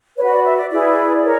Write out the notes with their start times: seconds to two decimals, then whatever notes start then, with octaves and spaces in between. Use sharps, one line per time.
0.17 B4 C#5
0.22 F#4
0.31 D5
0.44 E5
0.57 D5
0.69 E4 G#4 B4 D5
1.23 A#4 C#5